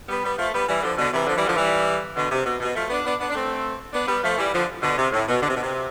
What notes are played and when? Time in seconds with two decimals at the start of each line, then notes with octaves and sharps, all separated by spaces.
0.09 G3 B3
0.23 G3 B3
0.38 F3 A3
0.53 G3 B3
0.68 E3 G3
0.82 D3 F3
0.97 B2 D3
1.12 C3 E3
1.27 D3 F3
1.36 E3 G3
1.46 D3 F3
1.57 E3 G3
2.16 B2 D3
2.31 C3
2.45 B2
2.61 B2
2.75 F3 A3
2.90 B3 D4
3.05 B3 D4
3.20 B3 D4
3.30 D4
3.34 A3 C4
3.93 B3 D4
4.08 G3 B3
4.23 F3 A3
4.38 E3 G3
4.53 D3 F3
4.82 B2 D3
4.97 C3
5.12 A2
5.27 B2
5.41 D3
5.48 C3
5.56 B2
5.63 C3